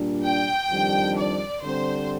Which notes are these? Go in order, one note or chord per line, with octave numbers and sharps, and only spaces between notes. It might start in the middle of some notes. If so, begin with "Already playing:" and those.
Already playing: A#2 G3 D4
G5
F2 D#3 G3 D4
D5
D3 G3 C4 C5